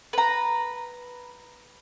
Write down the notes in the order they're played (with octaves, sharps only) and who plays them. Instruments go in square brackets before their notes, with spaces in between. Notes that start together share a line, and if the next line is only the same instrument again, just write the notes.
[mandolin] B4 A#5